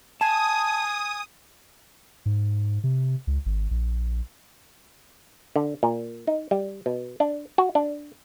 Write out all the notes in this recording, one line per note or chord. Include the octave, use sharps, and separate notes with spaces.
G#5 A5 D#6
G#2
C3
C#2
G#1
A#1
D3
A#2
D#4
G3
B2
D4
F#4
D4